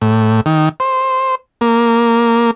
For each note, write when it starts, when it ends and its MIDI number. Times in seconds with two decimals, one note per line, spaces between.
0.02 0.41 45
0.46 0.69 51
0.80 1.35 72
1.61 2.51 58